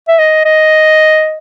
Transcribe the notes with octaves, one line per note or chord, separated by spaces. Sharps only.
E5
D#5
D#5